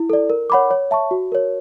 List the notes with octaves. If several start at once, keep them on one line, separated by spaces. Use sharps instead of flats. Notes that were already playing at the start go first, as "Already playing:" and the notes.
Already playing: E4
A4 D5
A#4
C#5 F#5 B5 D6
C#5
E5 A5 C#6
F#4
A#4 C#5